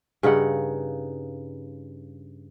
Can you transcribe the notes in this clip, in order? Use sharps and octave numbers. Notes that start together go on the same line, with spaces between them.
G2 C#3 D#4 F#5